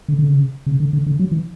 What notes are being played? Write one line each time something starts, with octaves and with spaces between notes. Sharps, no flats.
D3
D3
C#3
C#3
D3
D3
D3
F#3
E3